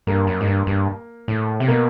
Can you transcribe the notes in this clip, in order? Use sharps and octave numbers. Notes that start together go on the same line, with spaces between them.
G2 A#3
F#2
G#2
G2
G2
A2
C3
B2 A#3